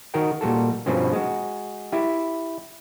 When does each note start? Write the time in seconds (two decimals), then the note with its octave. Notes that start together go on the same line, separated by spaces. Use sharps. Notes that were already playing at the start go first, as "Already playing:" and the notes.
0.14 D#3 F#4 A#4 G5
0.41 A#2 G3 F#4 A4
0.86 G2 B2 F3 C4 C#4
1.13 G#3 F#4
1.92 E4 G4